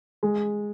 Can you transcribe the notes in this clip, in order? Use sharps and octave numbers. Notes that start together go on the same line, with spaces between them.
G#3